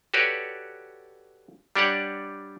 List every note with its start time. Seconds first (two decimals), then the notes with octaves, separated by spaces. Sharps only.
0.14 F#4 G4 A4 B4 C#5 D5
1.76 G3 D4 G4 C#5 D5 F#5